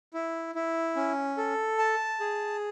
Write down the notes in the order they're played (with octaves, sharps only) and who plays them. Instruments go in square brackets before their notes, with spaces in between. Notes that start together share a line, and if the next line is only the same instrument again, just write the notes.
[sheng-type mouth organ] E4
E4
C#4
A4
A5
G#4